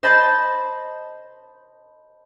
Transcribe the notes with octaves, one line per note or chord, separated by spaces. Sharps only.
C5 D#5 A5 B5 G6 A6